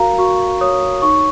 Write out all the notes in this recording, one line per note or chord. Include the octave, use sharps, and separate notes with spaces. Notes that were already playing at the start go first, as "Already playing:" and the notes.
Already playing: F#4 A#4 F5 A#5
F#4 C#6
C#5 D#6
D#4 C#6